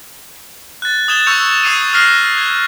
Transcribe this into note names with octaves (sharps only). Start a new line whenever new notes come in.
F#6 A6
D#6 G#6 E7 G7
C#6 E6 G6 C#7 F7
D#6 G#6 C7 C#7 D#7 F7
D#6 F6 F#6 A#6 C7 G7
G#6